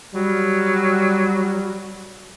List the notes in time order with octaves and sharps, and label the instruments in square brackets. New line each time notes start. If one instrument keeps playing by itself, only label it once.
[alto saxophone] F#3 [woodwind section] G3